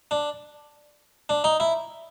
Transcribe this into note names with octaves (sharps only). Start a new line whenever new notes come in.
D4
D4
D#4
E4